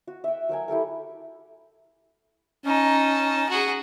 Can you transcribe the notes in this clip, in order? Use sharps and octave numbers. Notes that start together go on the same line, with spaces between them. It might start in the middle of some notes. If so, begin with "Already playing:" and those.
F#4
E5 G5
F#3 A#4 G5 G#5
E4 G4 A4 A#4
C#4 D#4 A5
F#4 G#4